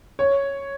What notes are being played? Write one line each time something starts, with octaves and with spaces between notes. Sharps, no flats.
C#5